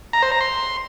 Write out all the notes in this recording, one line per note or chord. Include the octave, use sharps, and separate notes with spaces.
A#5
C5
A#5
C6